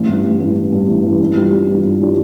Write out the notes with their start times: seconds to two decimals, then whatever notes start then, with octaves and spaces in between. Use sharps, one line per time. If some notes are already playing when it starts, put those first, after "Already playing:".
Already playing: A1
0.08 G2 E3
0.24 A1
0.40 G2 E3
0.56 A1
0.72 G2 E3
0.89 A1
1.04 G2 E3
1.21 G2
1.36 E3 G3 D4 F4
1.52 G2
1.68 E3 G3 D4 F4
1.84 G2
2.00 E3 G3 D4 F4